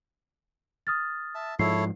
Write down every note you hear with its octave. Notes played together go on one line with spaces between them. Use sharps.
D#6 F6 A6
E5 A5
G#2 F3 G#3 E4 A4 C#5 C7